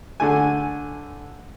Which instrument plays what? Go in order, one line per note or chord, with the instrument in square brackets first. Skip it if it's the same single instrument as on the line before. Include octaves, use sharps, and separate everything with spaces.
[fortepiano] D3 A3 G#5